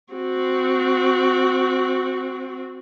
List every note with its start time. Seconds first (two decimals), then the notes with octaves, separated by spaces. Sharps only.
0.13 C4 F#4